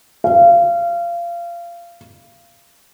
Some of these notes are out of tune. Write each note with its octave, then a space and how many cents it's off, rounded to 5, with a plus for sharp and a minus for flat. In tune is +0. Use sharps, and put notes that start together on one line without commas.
F5 -25